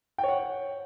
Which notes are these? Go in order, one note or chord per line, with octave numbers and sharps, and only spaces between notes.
C#5 F#5 G5